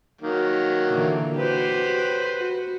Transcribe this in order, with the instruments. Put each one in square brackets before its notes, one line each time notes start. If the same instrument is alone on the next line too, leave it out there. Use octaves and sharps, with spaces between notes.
[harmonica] D#3 F#3 A#3
[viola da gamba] A#2 D3 E3
[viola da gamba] F#4 G4 [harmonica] B4 C5
[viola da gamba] F#4